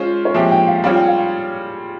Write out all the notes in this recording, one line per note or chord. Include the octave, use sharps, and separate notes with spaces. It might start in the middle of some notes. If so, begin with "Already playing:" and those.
Already playing: G#3 C#4 F4 C5 C#5
C#5
A#2 F3 G#3 C4 G4 E5
G5
F5
G3 C4 F4 G#4 C#5 F5
G5
F5